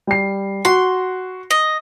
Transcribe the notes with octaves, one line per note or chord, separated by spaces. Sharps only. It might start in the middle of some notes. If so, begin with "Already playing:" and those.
G3 C7
F#4 C6
D#5